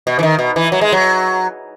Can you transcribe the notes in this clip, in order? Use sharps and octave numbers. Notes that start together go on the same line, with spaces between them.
B2
E3
D#3
B2
E3
F#3
G#3
F#3